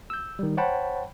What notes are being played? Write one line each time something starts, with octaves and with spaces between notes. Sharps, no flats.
E6 G6
D#3 G3
C5 C#5 F#5 G5 A5 B5